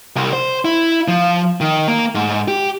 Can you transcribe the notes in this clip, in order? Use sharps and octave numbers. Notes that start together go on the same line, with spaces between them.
C2
C5
E4
F3
D#3
A#3
G#2
G4